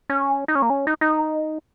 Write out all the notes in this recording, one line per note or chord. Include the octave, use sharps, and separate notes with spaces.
C#4
D#4
C#4
A#3
C#4
D#4
D#4